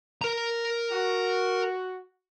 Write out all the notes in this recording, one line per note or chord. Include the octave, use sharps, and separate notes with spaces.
A#4 A#5
F#4